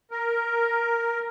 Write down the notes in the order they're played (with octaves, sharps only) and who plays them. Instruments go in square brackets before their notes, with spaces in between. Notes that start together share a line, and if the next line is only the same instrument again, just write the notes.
[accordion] A#4